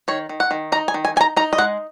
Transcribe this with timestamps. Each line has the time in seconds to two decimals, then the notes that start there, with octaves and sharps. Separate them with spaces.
0.08 D#3 C#5
0.29 D#3
0.40 F#5
0.51 D#3
0.72 D#4 A#5
0.88 G#5
0.94 D#3
1.05 G#5
1.16 D#4 G#5
1.21 A#5
1.36 D#4 A#5
1.53 D#5
1.58 G#3 F#5